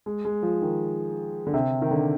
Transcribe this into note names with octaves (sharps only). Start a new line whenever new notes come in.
G#3
G#3
F3
D#3
D3
C3
D#3
D3